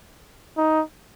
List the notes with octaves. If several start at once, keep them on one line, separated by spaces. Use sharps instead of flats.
D#4